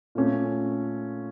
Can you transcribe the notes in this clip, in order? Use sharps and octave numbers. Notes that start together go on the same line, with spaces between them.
A#2 A3 C#4